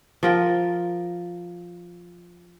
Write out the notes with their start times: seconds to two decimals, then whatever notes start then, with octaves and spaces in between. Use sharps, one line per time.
0.23 F3 A#4 G5